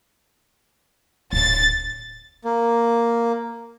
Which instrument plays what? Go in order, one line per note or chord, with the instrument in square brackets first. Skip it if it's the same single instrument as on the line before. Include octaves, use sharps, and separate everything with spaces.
[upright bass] D1 [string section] A6
[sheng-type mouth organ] A#3